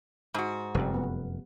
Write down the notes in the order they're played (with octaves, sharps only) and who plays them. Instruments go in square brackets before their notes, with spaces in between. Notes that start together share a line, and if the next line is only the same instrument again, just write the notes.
[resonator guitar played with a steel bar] G#2 F#4
[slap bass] F1 F#2 [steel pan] G3 C4 A4
[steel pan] B3